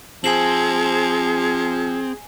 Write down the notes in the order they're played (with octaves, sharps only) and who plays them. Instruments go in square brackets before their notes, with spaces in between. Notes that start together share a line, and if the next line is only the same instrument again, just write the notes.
[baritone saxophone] F3 [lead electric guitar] C4 [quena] G#4 [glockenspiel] G#5 C7 F#7